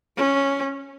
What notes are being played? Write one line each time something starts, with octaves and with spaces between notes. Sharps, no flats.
C#4